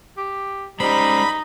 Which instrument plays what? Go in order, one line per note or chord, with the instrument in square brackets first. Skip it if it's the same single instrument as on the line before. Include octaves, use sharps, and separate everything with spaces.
[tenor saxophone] G4
[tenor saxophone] G3 [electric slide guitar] G#3 C#4 C5 [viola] D#4 [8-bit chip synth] B5